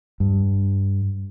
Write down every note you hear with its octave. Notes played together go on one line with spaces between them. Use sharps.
G2